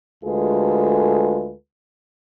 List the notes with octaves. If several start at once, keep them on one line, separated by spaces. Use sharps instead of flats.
D2 G#3 F4 G#4 A4 B4